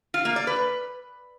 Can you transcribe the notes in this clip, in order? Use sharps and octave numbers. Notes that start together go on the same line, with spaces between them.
F4
A#3
D5
B4